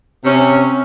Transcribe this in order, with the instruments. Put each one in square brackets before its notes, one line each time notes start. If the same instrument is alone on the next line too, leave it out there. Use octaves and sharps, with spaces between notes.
[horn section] C3 C#4